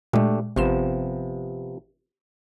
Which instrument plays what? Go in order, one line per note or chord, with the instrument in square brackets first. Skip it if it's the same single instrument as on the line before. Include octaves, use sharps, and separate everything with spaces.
[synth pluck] A#2 G#3 [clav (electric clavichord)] A3 D4 G4
[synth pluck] G#1 C6 E7 [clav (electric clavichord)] C3 F3 B3